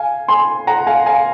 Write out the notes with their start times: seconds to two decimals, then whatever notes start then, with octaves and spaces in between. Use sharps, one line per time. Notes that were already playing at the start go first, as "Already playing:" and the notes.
Already playing: F5 G#5
0.28 G#5 C6
0.67 F#5 A#5
0.87 F5 G#5
1.06 F5 G#5